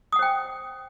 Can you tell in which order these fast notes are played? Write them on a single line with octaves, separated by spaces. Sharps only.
D#6 F#5 C5 G5